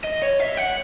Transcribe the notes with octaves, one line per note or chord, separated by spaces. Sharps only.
D#5
C#5
E5
F#5